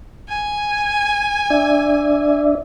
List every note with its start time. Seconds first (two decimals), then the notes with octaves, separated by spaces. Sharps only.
0.29 G#5
1.50 D4 D5 E5